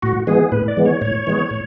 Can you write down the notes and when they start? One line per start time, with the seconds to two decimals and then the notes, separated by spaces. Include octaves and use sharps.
0.02 A2 F#4
0.27 E3 G#3 B3 G#4
0.52 A2 B4
0.68 D5
0.77 E3 G#3 B3
0.86 C#5
1.01 A2 C#5
1.27 E3 G#3 B3
1.50 A2